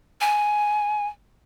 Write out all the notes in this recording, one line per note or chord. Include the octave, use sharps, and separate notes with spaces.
G#5